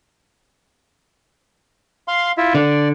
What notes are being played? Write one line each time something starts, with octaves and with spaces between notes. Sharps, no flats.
F5 C6
E4 F4 E5
D3 D5